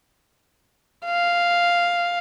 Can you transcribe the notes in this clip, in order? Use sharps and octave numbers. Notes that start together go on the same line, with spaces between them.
F5